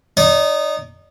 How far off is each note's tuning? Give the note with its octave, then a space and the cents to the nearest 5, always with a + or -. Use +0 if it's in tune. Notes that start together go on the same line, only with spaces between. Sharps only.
D#4 -15 D5 -45